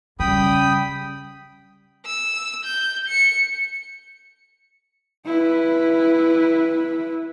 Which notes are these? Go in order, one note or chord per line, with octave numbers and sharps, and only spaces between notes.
C#3 G3 C#4 G5 B5 D#6
E6
G6
C#7
E4 B4